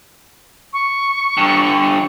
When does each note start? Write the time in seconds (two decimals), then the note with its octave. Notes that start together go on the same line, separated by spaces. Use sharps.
0.73 C#6
1.37 G2 D3